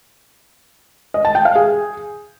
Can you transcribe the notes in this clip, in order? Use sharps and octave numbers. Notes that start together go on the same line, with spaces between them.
D#5
A5
G5
F5
G#4